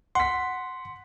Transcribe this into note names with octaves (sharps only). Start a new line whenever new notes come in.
F#5 C6 B6